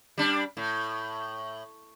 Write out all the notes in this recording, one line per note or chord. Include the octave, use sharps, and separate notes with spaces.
G3 D4
A2